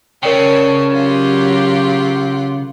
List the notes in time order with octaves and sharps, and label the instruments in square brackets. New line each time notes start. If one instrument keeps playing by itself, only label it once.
[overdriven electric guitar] C#3 [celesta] A#4 D5 G5 [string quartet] C#5 A5
[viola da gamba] F#3 G4 [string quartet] F4 F#5